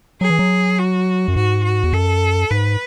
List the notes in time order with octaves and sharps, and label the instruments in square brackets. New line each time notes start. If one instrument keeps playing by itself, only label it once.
[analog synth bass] F#3 [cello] G#4
[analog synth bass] E3
F#3
[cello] F#4
[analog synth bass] F#2
[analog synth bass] G#2 [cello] F#4
[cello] F#4
[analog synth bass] E2
[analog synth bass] F#2 [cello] A4
[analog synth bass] G#2 [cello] B4